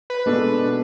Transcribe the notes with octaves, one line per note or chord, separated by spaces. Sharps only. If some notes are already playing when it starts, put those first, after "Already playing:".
B4
B2 G#3 D4 A4